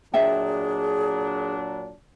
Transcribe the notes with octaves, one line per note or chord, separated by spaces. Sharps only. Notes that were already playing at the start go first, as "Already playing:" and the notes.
A#2 F#3 D4 G#4 D#5 E5 G5